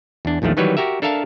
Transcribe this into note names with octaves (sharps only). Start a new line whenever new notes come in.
E2 D4
A#1 E2 D#3 F3 A3
D#3 E3 F#3 G3 B4 C#5
F#4 G4 A#4 E5
D4 A4 A#4 E5 F5 A5